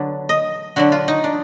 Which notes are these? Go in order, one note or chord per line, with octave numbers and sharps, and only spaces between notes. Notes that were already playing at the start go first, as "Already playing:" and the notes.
Already playing: D3 F#3 B3 D4
D#5
D3 F#3 D4 F#4
F4
D#4
D4